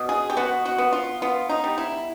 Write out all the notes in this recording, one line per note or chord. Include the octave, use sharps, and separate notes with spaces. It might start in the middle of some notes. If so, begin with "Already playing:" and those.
Already playing: B2
G#4
G4
B3 F#4
F#4
B3
F4
B3 F4
D#4
G3
E4